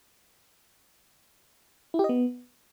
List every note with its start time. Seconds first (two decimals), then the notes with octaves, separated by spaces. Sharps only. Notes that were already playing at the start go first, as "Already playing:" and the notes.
1.94 E4
1.99 G4
2.04 D#5
2.09 B3